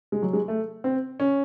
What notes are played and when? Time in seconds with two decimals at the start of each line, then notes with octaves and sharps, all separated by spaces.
0.12 G#3
0.22 F#3
0.33 G#3
0.48 A3
0.84 C4
1.20 C#4